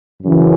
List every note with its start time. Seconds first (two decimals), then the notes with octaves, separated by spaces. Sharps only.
0.23 F#2 C#3 E3